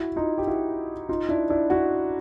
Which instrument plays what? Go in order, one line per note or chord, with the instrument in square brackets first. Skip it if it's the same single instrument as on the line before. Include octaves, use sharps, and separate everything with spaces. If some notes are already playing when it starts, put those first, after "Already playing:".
Already playing: [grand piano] E4 F#4
D#4 F4
G4
E4 F#4
D#4 F4
D4 E4
D4 E4
E4 F#4